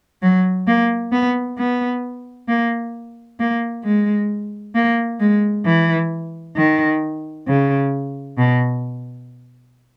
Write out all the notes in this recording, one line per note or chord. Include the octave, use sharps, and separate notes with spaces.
F#3
A#3
B3
B3
A#3
A#3
G#3
A#3
G#3
E3
D#3
C#3
B2